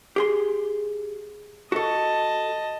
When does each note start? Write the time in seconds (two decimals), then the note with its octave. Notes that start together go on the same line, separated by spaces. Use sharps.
0.16 G4 G#4 C6
1.72 F#4 A4 D#5 A5